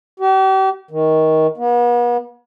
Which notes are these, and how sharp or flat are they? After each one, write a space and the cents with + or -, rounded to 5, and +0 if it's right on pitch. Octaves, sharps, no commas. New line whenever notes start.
G4 -40
D#3 +20
B3 -40